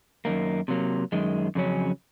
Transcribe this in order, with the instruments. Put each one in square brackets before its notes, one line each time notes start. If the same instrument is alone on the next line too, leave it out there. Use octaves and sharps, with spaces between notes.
[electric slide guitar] F#2 D#3 A#3
C3 F#3 A#3
F#2 D#3 G#3
F2 C#3 F#3 C#4